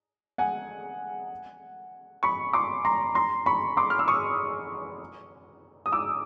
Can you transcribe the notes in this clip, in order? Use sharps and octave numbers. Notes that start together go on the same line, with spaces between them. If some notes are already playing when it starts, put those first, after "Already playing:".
F#5 G#5
B5 C#6
C6 D6
A#5 C6
A#5 C6
B5 C#6
C6 D6
F6
E6
C#6 D#6
D#6
D6 E6